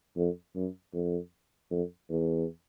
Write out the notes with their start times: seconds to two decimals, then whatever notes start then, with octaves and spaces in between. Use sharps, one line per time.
0.17 F2
0.55 F#2
0.94 F2
1.70 F2
2.10 E2